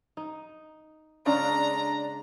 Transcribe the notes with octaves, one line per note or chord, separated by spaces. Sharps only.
D#4
C#3 G#3 D4 A#5